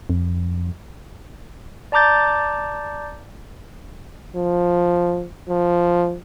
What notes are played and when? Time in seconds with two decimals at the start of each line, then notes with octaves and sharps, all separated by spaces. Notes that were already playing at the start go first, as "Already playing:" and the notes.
0.10 F2
1.92 D5 A5 A#5 D6 G6 A6
4.35 F3
5.49 F3